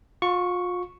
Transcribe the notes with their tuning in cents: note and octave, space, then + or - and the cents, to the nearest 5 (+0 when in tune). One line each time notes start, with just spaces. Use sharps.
F4 +35 C#6 +0